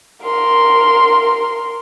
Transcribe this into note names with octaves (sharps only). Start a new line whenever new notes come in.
A#4 C6